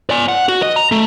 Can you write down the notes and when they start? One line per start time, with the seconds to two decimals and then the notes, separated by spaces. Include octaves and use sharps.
0.10 D5 G#5
0.28 F#5
0.49 F#4
0.62 D#5
0.76 A#5
0.92 A3